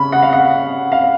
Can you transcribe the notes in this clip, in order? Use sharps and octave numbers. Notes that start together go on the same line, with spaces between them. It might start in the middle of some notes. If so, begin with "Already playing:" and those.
Already playing: C#3 B5
F#5
F5
F#5
F5